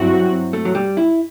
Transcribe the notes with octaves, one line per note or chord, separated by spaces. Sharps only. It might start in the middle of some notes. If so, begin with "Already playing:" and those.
Already playing: G2 F#3 C4 E4 F#4
A3
F#3
G3
E4